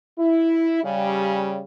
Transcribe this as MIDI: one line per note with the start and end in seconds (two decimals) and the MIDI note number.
0.18 0.80 64
0.84 1.60 49
0.84 1.60 55